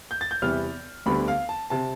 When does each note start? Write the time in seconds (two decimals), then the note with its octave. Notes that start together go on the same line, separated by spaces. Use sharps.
0.11 G6
0.21 A6
0.31 G6
0.42 E2 C3 E3 G3 B3 F6
1.06 D2 D3 G3 B3 B5
1.28 F5
1.49 A5
1.70 C3 A5